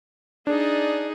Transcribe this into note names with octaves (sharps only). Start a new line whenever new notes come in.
D4 D#4 G#4 D5